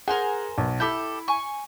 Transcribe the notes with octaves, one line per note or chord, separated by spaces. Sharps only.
G#4 A#4 C5 F#5 G#5
B1
E4 G4 A4 G6
G#5 C#6